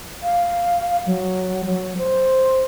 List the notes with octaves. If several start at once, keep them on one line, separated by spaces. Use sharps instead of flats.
F5
F#3
F#3
C5